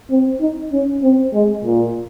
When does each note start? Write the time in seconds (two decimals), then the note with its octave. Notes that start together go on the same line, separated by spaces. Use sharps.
0.10 C4
0.41 D#4
0.73 C#4
1.03 C4
1.33 G#3
1.64 A#2